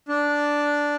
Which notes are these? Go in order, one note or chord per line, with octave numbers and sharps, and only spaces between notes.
D4